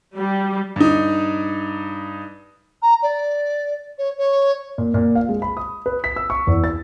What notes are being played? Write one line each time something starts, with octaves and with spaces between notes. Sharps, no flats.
G3
G2 D#4
A#5
D5
C#5
C#5
A#2
A#2
F5
G#3
B5
D#6
B4
B6
E6
C#6
E2
A6